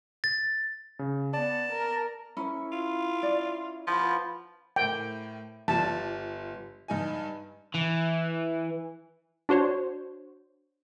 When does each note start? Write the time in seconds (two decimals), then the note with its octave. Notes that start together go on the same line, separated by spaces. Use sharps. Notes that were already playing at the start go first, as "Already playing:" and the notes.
0.24 A6
0.99 C#3
1.33 B3 D5 A5
1.72 A#4
2.37 C#4 E4 A#4 C#5
2.72 F4
3.23 C#4 D5
3.87 F3 F#5 B5
4.00 F4 B4 C5
4.76 A2 A#4 G5
5.68 G1 G3 F4 A5
6.88 G2 D#4 G#5
7.74 E3
9.49 D4 F#4 C5 C#5